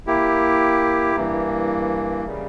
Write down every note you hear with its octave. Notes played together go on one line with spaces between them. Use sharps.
A#3 E4 G4
G2 E3 A#3
C#3 G3